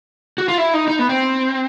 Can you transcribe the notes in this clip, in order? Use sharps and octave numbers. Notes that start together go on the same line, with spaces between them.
F#4
F4
E4
D#4
D#4
B3
C4